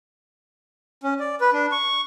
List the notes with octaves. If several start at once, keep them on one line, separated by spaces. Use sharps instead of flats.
C#4
D5
B4
D4
C#6